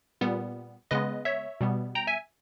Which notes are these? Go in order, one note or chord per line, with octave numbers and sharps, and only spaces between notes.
A#2 G3 B3
C#3 G#3 B3 B4 D#5
C#5 E5
B2 G3 B3
G5 A#5
E5 G#5